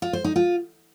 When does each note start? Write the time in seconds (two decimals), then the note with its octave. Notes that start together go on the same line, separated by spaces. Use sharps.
0.02 F4
0.13 C5
0.24 D#4
0.36 F4